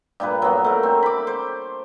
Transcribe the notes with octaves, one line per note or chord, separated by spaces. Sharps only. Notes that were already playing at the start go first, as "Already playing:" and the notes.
G2 A#2 B4
F#3 B3
A3 A#4
C4
B5 D6
C5